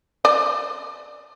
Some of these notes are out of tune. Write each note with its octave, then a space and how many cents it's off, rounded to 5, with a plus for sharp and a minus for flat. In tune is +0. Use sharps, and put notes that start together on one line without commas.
D5 +20